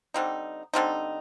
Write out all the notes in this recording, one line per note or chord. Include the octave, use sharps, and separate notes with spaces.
D3 G3 C4 D#4
D3 G3 C4 D#4